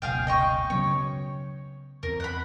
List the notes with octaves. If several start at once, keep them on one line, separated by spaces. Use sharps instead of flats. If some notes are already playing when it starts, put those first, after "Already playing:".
F1 C#2 B2 G#4 F5 G5
D#5 G5 C#6
C#3 F#3 B3 C#5
E2 C4 A#4
F#5 B5